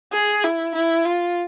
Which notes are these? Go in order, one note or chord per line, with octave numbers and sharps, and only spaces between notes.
G#4
E4
E4
F4